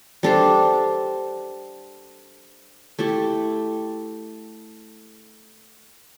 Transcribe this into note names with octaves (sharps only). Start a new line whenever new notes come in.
G3 D4 A4 C5
A3 E4 G4